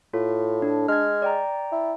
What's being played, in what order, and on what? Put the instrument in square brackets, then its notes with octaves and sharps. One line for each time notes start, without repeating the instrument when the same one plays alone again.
[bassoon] A2 [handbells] F4
[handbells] D4
[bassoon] G#3 [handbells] F6 G#6
[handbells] D5 G5 A#5
[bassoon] E4